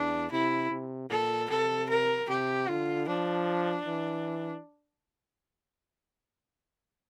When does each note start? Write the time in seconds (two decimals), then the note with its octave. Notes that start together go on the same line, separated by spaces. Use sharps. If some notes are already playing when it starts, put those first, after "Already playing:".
Already playing: E2 D4
0.31 C3 E4
0.71 C3
1.10 A#2 A4
1.50 C3 A4
1.89 A#4
2.29 C3 G4
2.68 D3 F4
3.07 F3 D4
3.86 E3